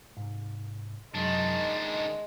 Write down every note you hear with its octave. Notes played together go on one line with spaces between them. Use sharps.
G#2 C3
F#2 C3 D#3 F#3 G#3 D4
D#5